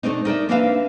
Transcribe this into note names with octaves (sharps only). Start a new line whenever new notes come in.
B2 A3 C4 D4 D#4
D#4 A#4 D5 E5
A#3 C4 D4 B4 E5 F5